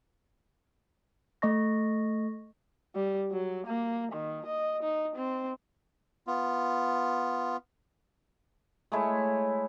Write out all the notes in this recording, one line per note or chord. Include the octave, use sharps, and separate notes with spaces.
A3 D#5 C#6 A#6
G3
F#3
A#3
D#3
D#5
D#4
C4
B3 F4
G#3 A3 E4 C#5